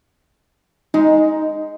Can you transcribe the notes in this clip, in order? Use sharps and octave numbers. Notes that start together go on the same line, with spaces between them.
G#3 D#4